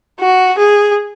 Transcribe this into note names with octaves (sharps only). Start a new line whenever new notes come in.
F#4
G#4